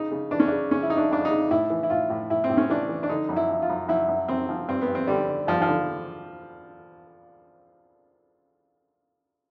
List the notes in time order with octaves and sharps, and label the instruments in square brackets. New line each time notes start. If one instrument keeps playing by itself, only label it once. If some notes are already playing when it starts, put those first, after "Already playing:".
Already playing: [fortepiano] C#3 D#4
C#3
E3 D4
C#4
C#3 D4
C#3 C#4
E4
F2 D#4
D4
F2 D4
D#4
C#3
A2 E4
E3
E4
A2 F4
A2
A2 E4
C4
A2
C#4
E3 D4
E3
D4
D3 D#4
F#2
E4
F3
F4
F#2
F#2 E4
F#2
F#2 C4
F3
G2 C4
B3
G2
C4
D3 G3
D3
G2 F3
F3
D3